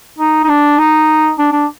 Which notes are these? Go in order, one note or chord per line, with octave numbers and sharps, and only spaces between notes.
D#4
D#4
D4
D#4
D4
D4